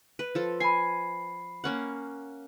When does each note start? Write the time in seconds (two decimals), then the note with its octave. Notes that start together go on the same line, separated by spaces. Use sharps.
0.19 B4
0.35 F3 A4
0.60 G#5 B5 C7
1.64 A#3 C#4 F#5